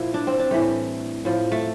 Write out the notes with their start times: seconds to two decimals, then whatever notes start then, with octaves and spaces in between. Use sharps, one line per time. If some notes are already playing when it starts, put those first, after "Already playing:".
Already playing: A#2 F3 E4
0.14 D4
0.27 C4
0.39 D4
0.51 A2 E3 G3 A3
1.25 A2 F3
1.52 A3